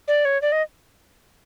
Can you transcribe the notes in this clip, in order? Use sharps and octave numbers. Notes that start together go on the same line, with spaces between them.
D5
C#5
D5
D#5